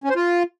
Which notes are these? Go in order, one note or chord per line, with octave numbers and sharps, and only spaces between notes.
C#4
C5
F4